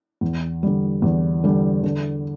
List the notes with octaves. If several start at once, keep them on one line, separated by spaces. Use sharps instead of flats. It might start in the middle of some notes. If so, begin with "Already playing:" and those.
E2
D3 G3
E2
D3 G3
D3